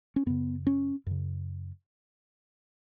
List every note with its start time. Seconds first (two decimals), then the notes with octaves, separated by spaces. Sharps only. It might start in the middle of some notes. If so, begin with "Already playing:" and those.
0.16 C#4
0.26 F#2 C#3 B3
0.67 C#4
1.06 F#2 C#3